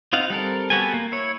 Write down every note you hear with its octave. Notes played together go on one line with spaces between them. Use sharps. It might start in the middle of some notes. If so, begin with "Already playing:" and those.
C4 D#4 F4 F5 F#5
G3 C4 A4 A#4
B3 F#4 G4 A4 G#5
A#3
E4 C#5